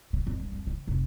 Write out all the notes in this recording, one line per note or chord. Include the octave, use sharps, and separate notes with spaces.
C#3
F2
G2
F2
C#3
F1